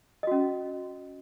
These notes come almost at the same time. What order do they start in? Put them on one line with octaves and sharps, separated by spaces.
D#5 F#4 C#4